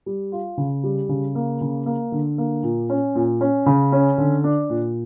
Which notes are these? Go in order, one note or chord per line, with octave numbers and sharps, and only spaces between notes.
G3
F4
C#3
G3
C#3
A#3
C#3
A#3
D3
A#3
A#2
C#4
A#2
C#4
C#3
C#4
D3
D4
A#2